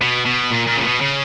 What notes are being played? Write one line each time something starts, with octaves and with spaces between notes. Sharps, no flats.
B2
B2
A#2
A#2
C#3
B2
C#3